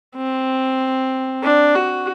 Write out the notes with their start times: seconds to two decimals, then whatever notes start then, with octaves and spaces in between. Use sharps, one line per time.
0.16 C4
1.43 D4
1.75 F#4